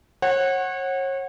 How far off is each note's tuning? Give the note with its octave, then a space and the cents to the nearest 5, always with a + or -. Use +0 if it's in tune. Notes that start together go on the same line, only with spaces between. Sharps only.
C#5 -35 F#5 +0